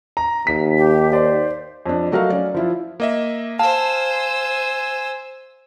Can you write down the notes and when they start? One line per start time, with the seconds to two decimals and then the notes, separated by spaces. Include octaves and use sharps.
0.17 A#5
0.47 D#2 B6
0.78 G4
1.13 C5 D5
1.86 F2 D4
2.11 F#3 A3 F#4 A#4 D#5 F5
2.30 C#4 D5
2.54 F3 E4 F4
3.00 A#3 D#5 E5
3.59 C5 F5 G#5 A5 E6